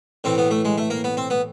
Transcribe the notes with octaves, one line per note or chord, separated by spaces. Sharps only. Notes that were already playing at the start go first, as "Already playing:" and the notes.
A2 E3 C4
B3
A3
G#3
A3
A#3
B3
C4
B3